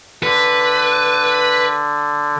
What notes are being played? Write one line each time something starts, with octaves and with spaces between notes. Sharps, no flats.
D3 B4